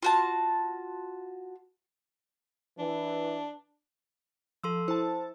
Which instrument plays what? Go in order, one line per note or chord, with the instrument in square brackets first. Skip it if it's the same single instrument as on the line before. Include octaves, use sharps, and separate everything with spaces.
[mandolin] F4 F#4 A5
[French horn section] E3 [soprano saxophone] D4
[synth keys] F3 [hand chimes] A4 C6 E6
[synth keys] E4 A5 [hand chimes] C5